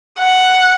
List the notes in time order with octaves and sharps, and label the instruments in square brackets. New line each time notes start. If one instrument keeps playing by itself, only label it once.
[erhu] F#5